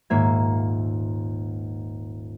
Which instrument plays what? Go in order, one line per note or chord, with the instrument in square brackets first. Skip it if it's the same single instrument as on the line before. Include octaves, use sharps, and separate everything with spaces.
[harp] D#1 G#2 A#3 E5 G#6